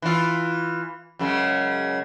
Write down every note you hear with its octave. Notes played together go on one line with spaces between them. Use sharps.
E3 F4
F#2 C#3 G#3